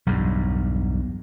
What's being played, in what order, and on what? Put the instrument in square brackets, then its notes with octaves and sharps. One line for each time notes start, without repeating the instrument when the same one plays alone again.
[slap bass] B1 E2 G2